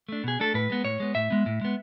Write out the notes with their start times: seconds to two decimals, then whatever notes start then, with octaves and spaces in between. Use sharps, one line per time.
0.09 A3 D4
0.24 B2 G#4
0.40 A3 D4 A4
0.54 A2 B4
0.70 G#3 B3
0.84 A2 C#5
1.00 G#3 B3
1.15 A2 E5
1.30 G#3 B3
1.46 A2
1.61 G#3 B3